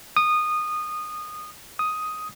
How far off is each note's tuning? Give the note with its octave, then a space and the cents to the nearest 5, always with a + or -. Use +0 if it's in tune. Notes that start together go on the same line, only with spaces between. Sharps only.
D#6 -20
D#6 +5